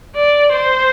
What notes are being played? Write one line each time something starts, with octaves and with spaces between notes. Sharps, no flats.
D5
C5